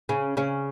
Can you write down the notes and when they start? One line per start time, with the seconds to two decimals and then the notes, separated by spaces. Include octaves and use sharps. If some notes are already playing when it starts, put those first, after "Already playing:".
0.09 C#3 C#4
0.37 C#3 C#4